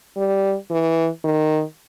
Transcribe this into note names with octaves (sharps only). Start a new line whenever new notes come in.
G3
E3
D#3